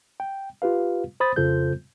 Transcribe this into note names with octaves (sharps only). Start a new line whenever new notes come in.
G5
F4 G4 B4 F5
C5 B5 D#6 A6
F2 C#3 F4 A4 C5 G6